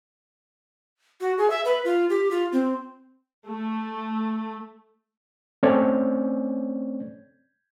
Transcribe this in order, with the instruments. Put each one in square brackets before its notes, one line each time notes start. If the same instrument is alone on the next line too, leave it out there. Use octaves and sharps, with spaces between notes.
[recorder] F#4
G#4
E5
B4
F4
G4
F4
C4
[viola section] A3
[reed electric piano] A3 C4 C#4 C#5 D5